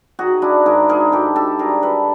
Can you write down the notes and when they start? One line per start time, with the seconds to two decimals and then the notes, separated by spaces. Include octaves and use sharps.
0.19 D#3 F#4 G#4
0.42 D4 E4
0.66 G#2 G#4 A#4
0.89 G#4 A#4
1.12 G#2 G4 A4
1.36 G4 A4
1.59 G3 G#4 A#4
1.83 A4 B4